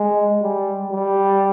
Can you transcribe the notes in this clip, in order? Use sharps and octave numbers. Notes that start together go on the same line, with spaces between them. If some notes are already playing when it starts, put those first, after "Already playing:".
Already playing: G#3
G3
G3